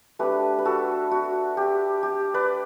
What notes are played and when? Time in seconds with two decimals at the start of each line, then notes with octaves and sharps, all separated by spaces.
0.19 A3 D4 G4 B4
0.59 B4
0.65 F#4 A4
1.11 F#4
1.57 G4
2.03 G4
2.34 B4 D5